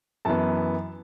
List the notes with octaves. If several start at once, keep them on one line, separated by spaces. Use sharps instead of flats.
F#2 E3 B3 A5